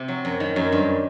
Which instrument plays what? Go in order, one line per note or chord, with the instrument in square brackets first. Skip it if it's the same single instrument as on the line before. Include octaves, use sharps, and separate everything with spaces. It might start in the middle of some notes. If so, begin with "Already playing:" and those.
Already playing: [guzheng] C3
F#3
F#2
D#3
F#2
G2